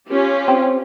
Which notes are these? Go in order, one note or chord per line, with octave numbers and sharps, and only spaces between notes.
C#4 F4 G4
C4